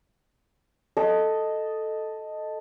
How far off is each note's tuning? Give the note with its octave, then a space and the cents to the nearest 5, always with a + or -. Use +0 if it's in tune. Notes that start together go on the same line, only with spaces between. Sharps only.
A4 +0 D#5 +0